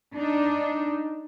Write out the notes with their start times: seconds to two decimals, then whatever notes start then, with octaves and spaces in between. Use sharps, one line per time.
0.14 D4 D#4